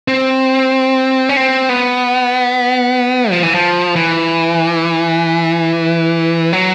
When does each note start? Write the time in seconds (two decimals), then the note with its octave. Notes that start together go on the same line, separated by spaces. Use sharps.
0.08 C4
1.29 C#4
1.37 C4
1.69 B3
3.31 F3
3.43 E3
3.54 F3
3.96 E3
6.53 F#3